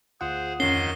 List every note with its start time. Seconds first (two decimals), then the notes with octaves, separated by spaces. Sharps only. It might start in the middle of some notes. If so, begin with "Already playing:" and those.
0.21 D2 F4 G#4 C5 F#5
0.60 F2 G#2 D#3 C#4 D#5 C7 G7